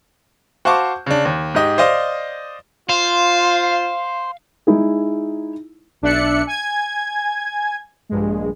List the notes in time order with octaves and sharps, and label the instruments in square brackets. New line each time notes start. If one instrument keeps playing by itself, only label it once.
[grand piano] F#4 C5 F5 A5 C#6 D6
C#3 D4
D#2
G#2 G4 D#5
C5 D5 D#5 F5
[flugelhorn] F4 [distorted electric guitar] C5 [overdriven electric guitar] F5
[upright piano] G#3 D#4 E4 G#4
[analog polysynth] B1 D4 D5 E5 F#6 C#7
G#5 G#6
A#1 G2 G#3